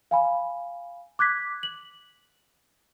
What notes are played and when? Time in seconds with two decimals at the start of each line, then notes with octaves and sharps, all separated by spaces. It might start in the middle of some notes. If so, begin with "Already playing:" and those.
0.11 F5 G#5 B5
1.19 D6 F#6 G#6 B6
1.63 F#7